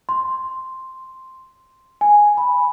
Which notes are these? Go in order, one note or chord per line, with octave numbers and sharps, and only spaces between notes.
C6
G#5
B5